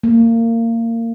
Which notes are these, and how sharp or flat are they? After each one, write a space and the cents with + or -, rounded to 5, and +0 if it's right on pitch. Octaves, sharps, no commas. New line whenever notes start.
A#3 -25